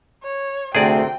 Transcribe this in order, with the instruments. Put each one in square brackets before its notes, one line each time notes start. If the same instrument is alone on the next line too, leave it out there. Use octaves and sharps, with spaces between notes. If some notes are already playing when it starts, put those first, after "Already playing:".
[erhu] C#5
[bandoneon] D2 [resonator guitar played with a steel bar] C3 A3 C4 [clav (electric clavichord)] G#4 D5 [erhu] G5